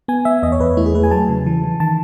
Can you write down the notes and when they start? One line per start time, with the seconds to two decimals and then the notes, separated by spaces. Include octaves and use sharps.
0.08 B3 G#5
0.25 B3 E5
0.43 E2 D#5
0.52 C#5
0.60 E2 B4
0.77 A3 E4
0.86 G#4
0.95 A3 B4
1.04 G#5
1.11 F#3 A5
1.29 C#3
1.46 E3
1.64 E3
1.80 D#3 A5